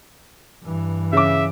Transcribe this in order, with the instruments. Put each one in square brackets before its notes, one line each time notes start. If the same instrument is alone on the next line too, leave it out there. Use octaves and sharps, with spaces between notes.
[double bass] G2 E3
[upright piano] C#3 D6 [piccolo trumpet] E5